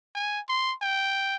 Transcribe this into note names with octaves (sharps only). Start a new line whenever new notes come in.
G#5
C6
G5